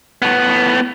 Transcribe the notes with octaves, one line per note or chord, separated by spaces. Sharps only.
A2 B3